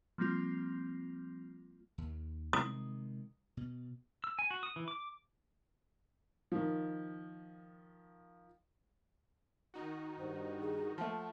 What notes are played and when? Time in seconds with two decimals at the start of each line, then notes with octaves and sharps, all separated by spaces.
0.18 F3 G3 A#3 C4 F4
1.98 D#2
2.53 C3 D#3 G#3 D#6
3.57 B2
4.24 E6
4.39 G#5
4.51 F#4
4.63 D#6
4.76 E3
4.88 D6
6.52 D#3 F3
9.74 D#3 D#4 F#4
10.19 G2 C5
10.61 G#4
10.98 F3 A3 F#5